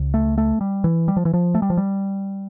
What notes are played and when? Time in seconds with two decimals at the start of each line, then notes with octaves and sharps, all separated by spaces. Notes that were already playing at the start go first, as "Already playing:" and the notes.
Already playing: C#2 C#3
0.14 A3
0.38 A3
0.61 G3
0.84 E3
1.08 G3
1.17 F3
1.25 E3
1.34 F3
1.55 A3
1.62 G3
1.70 F3
1.77 G3